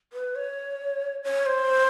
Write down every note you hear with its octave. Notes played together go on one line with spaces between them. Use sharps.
B4
C#5
C#5
C5